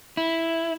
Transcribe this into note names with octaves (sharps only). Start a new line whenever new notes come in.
E4